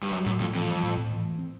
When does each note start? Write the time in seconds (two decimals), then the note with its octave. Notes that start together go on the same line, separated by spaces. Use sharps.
0.02 G2
0.11 F#2 G3
0.26 F#2 A2
0.40 F2 A2
0.54 F2 E3
0.69 G3
0.83 A2
0.97 A2
1.11 E3
1.24 A3
1.39 C4